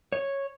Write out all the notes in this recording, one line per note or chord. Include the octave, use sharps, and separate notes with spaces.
C#5